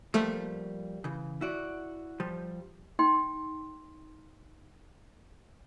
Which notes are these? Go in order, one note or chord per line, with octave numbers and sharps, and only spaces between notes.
F3 G3 A3 A#3
C#3 E3
E4 F#4 D5
F3 G3
D#4 G5 C6